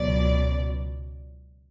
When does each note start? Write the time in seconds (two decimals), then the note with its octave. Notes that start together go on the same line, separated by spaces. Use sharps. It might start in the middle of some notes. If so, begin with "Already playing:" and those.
Already playing: C#2 B2 F#3 D5